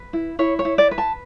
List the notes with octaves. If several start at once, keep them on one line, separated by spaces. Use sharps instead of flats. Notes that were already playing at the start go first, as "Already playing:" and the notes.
Already playing: B4
E4
E4 C#5
C#5
E4
D5
B4
A5